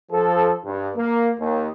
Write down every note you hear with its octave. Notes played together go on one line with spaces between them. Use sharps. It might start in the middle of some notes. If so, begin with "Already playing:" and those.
F3 A4
G2
A#3
D#2